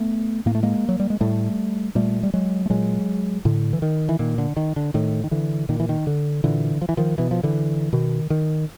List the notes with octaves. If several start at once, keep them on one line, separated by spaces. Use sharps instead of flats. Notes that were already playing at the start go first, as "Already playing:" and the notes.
Already playing: A3 B3
A2 A#3
A3
G#3 A#3
F#3
G3
G#3
A2 G3 A3
A#2 G3 A3
G3
F#3 G#3
A3
A#2 F#3 G#3
A2 D3
E3
D#3
E3
A#2 D#3
D3
D#3
D3
A2 D#3
D#3
D3 E3
A#2 D#3
E3
D#3
D3
A#2 D3 E3
F3
E3
D#3 F3
B2 E3
F3
D3 E3
B2 D#3
D#3